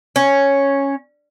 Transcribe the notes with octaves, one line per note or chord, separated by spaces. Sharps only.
C#4